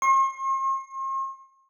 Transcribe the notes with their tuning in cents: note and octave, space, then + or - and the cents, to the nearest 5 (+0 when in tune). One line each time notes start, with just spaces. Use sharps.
C6 +45